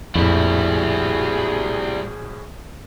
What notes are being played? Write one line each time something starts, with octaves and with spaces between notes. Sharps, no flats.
A#1 F2 A2 G3 E4 F#4 G#4